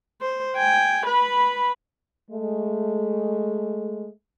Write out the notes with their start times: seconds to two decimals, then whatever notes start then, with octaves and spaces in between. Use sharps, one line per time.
0.21 C5
0.57 G5 G#5
1.06 B4 B5
2.31 G#3 A3